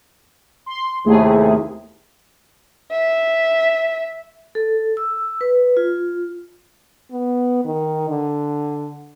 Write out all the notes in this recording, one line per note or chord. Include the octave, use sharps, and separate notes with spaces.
C6
D#2 C3 A3 E4 G#4
E5
A4
E6
B4
F4
B3
D#3
D3